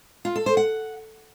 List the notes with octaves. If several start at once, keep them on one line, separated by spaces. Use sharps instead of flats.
F4
A4
C5
F#5